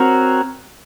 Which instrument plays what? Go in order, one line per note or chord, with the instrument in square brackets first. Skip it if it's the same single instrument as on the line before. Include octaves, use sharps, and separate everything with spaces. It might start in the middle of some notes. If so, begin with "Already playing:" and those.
Already playing: [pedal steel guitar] C4 F#4 A#4 C#5